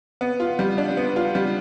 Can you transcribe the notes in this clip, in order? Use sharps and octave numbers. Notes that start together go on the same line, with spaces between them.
B3
F4
G3
D4
B3
F4
G3